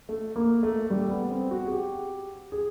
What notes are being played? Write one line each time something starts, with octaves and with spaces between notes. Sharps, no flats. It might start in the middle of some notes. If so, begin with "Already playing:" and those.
A3
A#3
A3
G3
B3
C4
F#4
G#4
G4
G#4